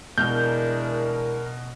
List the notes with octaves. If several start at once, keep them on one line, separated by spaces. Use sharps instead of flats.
B2 E3 G#3 D4 A#4 F6 G6